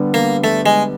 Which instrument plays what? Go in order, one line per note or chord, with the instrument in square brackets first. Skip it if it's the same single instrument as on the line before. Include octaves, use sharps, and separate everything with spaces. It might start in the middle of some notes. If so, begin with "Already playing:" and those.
Already playing: [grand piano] D3 G3 B3
[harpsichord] A#3
A3
G#3